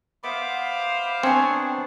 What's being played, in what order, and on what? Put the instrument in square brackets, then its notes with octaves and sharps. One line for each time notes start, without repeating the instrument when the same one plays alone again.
[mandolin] B3 E5 [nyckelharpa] C5 F5 [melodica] B5 D6
[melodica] B3 D4 [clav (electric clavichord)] C4 [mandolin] C#5 G#5 C6